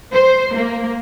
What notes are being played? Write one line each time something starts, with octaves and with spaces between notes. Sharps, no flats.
C5
A#3